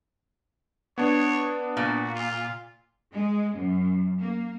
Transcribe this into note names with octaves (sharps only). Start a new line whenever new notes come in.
B3 D4 C#5
A#2 F#4
F4
G#3
F#2
A#3